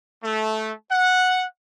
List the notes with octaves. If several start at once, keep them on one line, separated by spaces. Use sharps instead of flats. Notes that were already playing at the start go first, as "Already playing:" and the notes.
A3
F#5